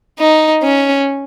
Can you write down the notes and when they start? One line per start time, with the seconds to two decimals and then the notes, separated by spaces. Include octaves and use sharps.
0.20 D#4
0.64 C#4